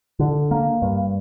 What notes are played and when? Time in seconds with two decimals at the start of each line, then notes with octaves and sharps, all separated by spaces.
0.19 D3
0.51 A#3
0.82 G2